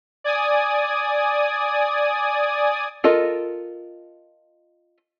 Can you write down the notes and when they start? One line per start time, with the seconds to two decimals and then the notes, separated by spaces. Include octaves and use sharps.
0.24 D5 G#5 D#6
3.04 F4 A4 A#4 D#5